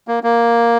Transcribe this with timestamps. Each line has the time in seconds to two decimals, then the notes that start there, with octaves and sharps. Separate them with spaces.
0.08 A#3
0.23 A#3